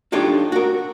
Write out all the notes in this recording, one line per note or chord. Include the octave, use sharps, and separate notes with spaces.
D4 D#4 F4 G4 A4 C#5
F#4 A#4